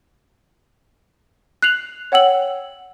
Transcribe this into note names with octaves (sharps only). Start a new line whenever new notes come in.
F#6 C7 F7 F#7
C#5 F#5 G5 E6 F#7